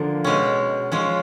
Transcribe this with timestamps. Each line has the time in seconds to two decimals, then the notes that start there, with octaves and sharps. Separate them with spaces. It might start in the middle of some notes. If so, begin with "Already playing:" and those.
Already playing: D3 F3 A#3
0.24 B2 G#3 C#4
0.92 F3 G#3 C#4